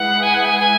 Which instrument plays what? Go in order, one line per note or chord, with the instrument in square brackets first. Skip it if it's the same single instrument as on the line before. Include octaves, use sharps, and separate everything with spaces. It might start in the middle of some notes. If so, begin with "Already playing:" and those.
Already playing: [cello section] G#3 E4 G#4 B4 [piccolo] F#5
[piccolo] G#5
F#5
G#5
G#5